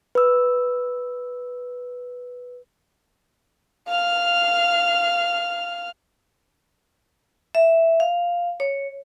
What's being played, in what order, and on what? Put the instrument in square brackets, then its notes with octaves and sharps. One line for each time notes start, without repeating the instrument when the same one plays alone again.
[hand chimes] B4 E6
[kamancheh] F5 F6
[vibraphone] E5
F5
C#5